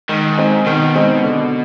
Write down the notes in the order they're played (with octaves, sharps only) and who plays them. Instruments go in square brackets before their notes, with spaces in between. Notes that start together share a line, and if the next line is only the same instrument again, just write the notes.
[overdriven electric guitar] G#2 [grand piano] D#3
[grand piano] G#3 C4 D#4
[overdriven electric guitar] B2 [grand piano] D#3
[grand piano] G#3 C4 D#4
D3